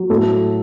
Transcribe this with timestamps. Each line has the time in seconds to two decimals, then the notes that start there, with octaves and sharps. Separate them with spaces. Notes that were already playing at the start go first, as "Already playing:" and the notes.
Already playing: F#3
0.10 A2 A4